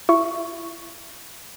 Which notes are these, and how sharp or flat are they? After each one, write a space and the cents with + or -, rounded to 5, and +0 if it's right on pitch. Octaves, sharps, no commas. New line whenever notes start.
E4 +30 C#6 +0